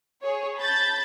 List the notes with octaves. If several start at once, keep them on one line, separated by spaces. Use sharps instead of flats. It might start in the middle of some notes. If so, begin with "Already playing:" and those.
G#4 C#5
A5 B5 G6 A6